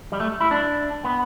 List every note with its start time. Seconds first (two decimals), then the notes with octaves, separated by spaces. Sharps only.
0.12 G3
0.20 A3
0.41 E4
0.51 D4
1.05 B3